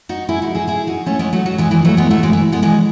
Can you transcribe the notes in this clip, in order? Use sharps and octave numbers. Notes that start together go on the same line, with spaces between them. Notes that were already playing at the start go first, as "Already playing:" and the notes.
D#4 F#4
E4 G#4
D#4 F#4
E4 G#4
E4 G#4
D#4 F#4
A3 C#4
G#3 B3
F#3 A3
F#3
E3 G#3
E3 G#3
F#3 A3
G#3 B3
F#3 A3
E3 G#3
E3
G#3 B3
E3 G#3